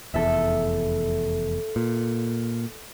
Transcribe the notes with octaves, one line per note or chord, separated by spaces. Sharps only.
F1 E2 A4 E5
A#2